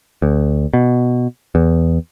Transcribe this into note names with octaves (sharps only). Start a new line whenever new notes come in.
D2
B2
E2